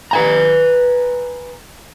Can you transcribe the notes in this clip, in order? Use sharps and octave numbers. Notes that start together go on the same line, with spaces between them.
B4 G#5 A#5